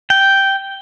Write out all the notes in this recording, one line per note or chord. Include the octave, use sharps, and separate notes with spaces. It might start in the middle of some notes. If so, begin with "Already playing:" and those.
G5